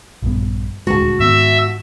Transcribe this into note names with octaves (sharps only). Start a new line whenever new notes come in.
A#1 G2 B3
D#1 D2 G#3 F#4 A5
G#2 D#3 B3 E5